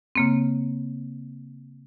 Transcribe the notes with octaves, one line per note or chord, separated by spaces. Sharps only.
C#3 A#3 C4